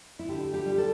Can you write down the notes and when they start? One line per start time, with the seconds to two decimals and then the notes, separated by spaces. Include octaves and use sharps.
0.19 E4
0.29 D3 G4
0.54 G4
0.66 G3
0.78 A4